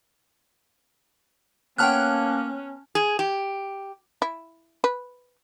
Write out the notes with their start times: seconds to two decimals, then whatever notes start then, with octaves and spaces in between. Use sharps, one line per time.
1.78 A#3 B3 C#4 C#5 G5 A5 F6 F#6
2.95 G#4
3.19 G4
4.22 E4
4.84 B4